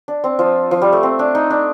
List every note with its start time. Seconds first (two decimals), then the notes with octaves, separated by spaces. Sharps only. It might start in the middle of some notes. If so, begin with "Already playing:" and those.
0.08 D4
0.24 C4
0.39 F3
0.71 F3
0.82 G3
0.92 A3
1.03 C4
1.19 D4
1.35 D#4
1.50 D4